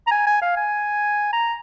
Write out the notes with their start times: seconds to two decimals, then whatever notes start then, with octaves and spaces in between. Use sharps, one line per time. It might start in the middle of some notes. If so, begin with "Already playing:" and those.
0.07 A#5
0.12 G#5
0.27 G#5
0.42 F5
0.57 G#5
1.33 A#5